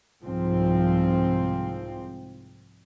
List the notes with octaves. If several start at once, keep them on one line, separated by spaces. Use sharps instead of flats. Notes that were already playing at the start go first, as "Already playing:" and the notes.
C2 G#2 F3 C4